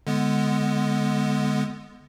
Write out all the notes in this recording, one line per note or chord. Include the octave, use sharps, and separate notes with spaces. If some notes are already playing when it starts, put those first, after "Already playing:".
D3 G#3 B3